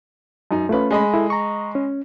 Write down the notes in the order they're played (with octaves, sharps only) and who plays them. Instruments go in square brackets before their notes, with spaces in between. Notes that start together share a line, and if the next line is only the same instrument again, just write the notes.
[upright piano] F#2 D#4
[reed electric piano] A3 C#4 [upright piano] F4 B4
[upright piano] G#3 D#5 B5
[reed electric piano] E4 A4
A#5 C#6
C#4